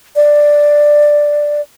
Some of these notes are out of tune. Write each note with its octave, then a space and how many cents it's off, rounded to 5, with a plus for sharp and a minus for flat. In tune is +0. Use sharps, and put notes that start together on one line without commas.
D5 +5